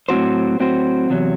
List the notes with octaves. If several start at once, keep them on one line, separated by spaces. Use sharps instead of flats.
A2 F#3 C4 F#4 C5
A2 F#3 C4 F#4 C5
E2 C3 F#3